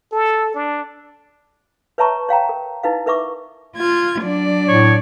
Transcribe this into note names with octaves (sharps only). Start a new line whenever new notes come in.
A4
D4
B4 C#5 E5 A5 A#5 C#6
C#5 F5 G5 A#5
A#4
D#4 E4 B4 F5
A#4 B4 E5 C#6 D6
F4 G#6
F#3 D4 D5
A2 C#5